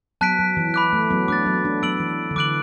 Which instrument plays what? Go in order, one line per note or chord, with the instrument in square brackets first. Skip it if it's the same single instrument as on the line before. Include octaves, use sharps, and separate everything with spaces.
[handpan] F#3 B3 [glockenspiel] A5 F#6 B6 D7
[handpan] F#3
E3
[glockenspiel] B5 D6 F#6
[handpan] A3
F#3 B3
[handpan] A3 D4 [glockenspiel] D6 F#6 A6
[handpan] F#3 B3
A3 D4
[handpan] F#3 B3 [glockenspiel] E6 D7 F#7
[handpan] E3
D3
[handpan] E3 [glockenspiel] D6 F#6 D7 F#7